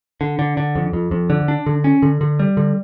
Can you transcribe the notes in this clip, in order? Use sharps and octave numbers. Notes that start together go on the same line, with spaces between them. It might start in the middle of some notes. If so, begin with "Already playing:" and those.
D3
D3
D3
F2
F2
F2
D3
D4
D3
C#4
D3
D3
G3
D3